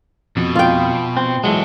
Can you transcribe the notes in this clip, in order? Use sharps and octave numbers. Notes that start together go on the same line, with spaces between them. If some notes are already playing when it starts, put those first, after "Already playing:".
F2 B2
F4 G5
C4
E3 F#3 G#3 F#4 A4